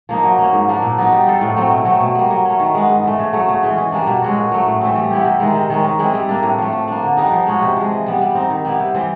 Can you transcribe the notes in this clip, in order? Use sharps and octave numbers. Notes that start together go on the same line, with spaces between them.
F3 A#3 D#4
F#3
A#3 C#4
G#2
F3 A#3 D4
A#2
F#3 B3 D#4
G3
C4 F4 A4
A2
F#3 A3 C4
B2
F#3 A3 C4
B2
G3 A#3
F#3
A3 C#4
D#3
G#3 B3
G#2
E3 A3
C#3
F#3 A3
C#3
E3 G#3 C#4
E3
G3 A#3 D4
B2
G#3 C#4 F#4
A#2
F#3 A3
A2
E3 A3 C4
G3
B3 E4 G4
C3
D#3 G#3
C3
D#3 G#3 C#4
D#3
G#3 C4 E4
G3
A#3 D4
A2
F3 A3
F3
A#3 D4
D3
G3 B3 D#4
F3
G#3 C#4 F#4
C3
F3 G#3
E3
G3 B3
G3
C4 D#4
D#3
G3 B3 E4
C3
E3 G3 C4